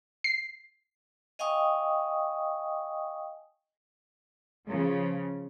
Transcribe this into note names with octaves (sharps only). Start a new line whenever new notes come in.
C7
D#5 F5 G5 G#5 C#6 D#6
C#3 F3